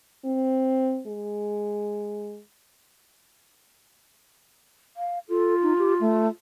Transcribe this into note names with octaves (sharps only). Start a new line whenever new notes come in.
C4
G#3
F5
F4 A4
D#4
G4
A3